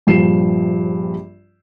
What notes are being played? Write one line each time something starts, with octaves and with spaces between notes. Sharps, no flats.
A#1 G2 F3 F4 C7 E7